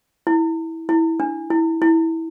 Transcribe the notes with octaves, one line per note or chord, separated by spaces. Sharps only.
E4
E4
D4
E4
E4